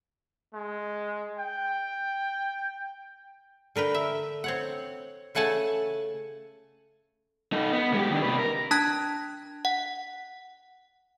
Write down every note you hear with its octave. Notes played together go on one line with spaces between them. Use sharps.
G#3
G5
D3 A#4 B4 G5
E5
C4 C#5 F#5
C#3 A3 F#5 G#5 A5
D#4 A4
B3
G#3 G4
D#3 D4
C3 B4
A#4
D4 A5 F#6 G#6
F#5